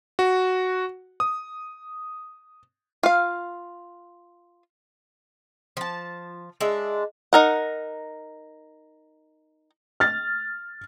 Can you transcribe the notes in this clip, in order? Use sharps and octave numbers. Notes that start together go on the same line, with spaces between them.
F#4
D#6
F4 F5
F3 A5
G#3 D4 E5
D#4 A#4 F#5
F6 A6